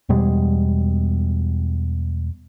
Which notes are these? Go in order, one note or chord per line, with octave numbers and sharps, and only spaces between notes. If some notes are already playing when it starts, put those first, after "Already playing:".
E2 B2 G3 G#3